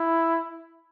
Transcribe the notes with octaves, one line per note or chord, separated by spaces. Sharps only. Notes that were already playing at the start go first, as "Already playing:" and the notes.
Already playing: E4